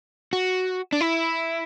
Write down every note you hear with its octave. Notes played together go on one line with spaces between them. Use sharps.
F#4
D4
E4